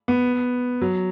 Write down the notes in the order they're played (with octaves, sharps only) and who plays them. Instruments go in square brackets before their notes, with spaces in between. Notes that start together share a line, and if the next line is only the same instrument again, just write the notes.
[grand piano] B3
F#3